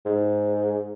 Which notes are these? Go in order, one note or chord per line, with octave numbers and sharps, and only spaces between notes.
G#2